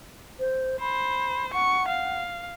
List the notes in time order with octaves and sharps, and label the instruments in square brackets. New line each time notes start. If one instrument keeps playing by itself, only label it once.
[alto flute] C5
[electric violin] C5 [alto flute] B5
[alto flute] F#5 [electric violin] C#6
[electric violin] F5